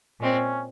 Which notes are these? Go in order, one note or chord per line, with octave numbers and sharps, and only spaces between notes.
A#2 G#3 C4 C#4